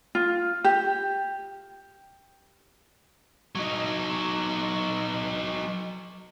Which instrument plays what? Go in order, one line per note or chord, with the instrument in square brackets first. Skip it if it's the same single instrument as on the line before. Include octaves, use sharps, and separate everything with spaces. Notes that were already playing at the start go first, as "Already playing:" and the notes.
[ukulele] F4
G4
[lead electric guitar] F#3 D#4